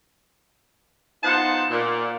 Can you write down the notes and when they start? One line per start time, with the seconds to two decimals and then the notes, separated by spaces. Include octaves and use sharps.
1.23 B3 D#4 F4 C5 F#5 A5
1.70 A#2